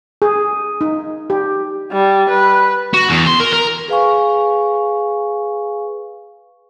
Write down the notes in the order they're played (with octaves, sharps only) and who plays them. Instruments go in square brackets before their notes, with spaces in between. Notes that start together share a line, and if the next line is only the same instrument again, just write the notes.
[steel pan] G#4
D#4
G4
[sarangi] G3
B4
[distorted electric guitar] F#4
E2
C6
A#4
A#4
[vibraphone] G#4 B4 F5 G#5 C#6